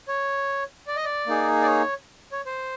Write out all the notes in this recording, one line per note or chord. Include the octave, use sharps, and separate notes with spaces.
C#5
D5
D#5
D5
A#3 D#4 G#4
D5
C#5
C#5
C5